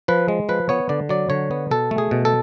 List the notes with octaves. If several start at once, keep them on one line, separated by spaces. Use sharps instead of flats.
F3 B4
G#3
F3 B4
B3 C#5
D3 D5
F#3 D5
D3 C#5
B3
B2 A4
A3
G#4
B2
A4